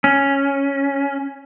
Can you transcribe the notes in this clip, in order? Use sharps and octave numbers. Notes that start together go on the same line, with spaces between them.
C#4